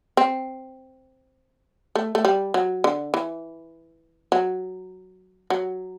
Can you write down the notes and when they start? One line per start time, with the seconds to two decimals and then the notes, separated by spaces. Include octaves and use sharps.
0.17 C4
1.95 A3
2.15 A3
2.25 G3
2.54 F#3
2.84 D3
3.14 E3
4.32 F#3
5.50 F#3